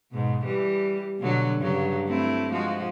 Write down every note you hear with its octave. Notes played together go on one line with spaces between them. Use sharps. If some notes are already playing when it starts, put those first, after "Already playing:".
G#2 B2
E3 G3
B2 D3 F#3
G2 C#3 F#3
A3 C4 E4
F3 G#3 F#4